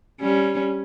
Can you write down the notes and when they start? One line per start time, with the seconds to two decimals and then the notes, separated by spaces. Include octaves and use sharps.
0.20 G3 C#4